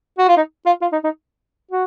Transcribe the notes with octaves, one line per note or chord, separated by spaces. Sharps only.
F#4
F4
D#4
F4
F4
D#4
D#4
F#4